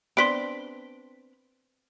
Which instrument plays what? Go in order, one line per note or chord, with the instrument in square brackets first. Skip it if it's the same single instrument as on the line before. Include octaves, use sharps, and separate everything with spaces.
[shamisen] B3 C4 D4 [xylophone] C6 B6 D7